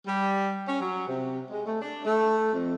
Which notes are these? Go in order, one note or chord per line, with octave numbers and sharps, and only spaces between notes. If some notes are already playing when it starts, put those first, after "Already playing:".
G3
C#4
F#3
C3
G#3
A3
D4
A3
F2